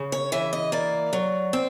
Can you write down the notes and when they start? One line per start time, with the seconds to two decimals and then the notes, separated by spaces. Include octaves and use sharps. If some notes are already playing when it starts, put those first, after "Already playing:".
Already playing: C#3
0.12 C#5
0.32 E3 E5
0.53 D#5
0.72 A#3 D5
1.13 F#3
1.53 C4